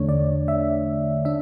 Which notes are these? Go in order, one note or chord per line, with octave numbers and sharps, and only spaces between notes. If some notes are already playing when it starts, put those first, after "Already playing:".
Already playing: E2 D3 A3 D4 C#5
D5
E5
D4 E5